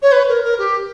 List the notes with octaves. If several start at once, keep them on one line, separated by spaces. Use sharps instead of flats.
C#5
B4
A#4
A#4
G4